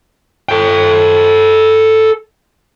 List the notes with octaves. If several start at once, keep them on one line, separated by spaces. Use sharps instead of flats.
A4 G5